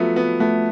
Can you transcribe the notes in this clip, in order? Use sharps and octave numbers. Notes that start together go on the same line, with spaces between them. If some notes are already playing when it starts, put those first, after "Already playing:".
Already playing: F3 F#3 A3 B3 F4
B3
A3 B3